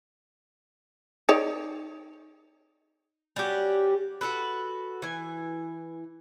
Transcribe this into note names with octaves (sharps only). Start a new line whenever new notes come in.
D#4 C#5 D5
G3 C#4 F#4 G4
F#4 G4 A4 B4
E3 G#5